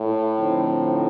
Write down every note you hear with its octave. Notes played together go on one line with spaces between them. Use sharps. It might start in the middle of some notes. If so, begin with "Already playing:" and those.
Already playing: A2
D3 F3 C4 D#4